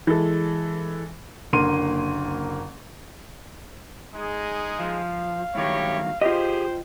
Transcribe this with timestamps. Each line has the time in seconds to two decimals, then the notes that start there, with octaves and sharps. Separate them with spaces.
0.07 E3 G#3 A4
1.53 F#1 D3 A#3 C6 D#7
4.14 G#3 D#4 G#4
4.80 F3 F5
5.55 G2 D#3 F#3 E4 G4 C#5
6.22 F4 G4 G#4 C5 D#5 G5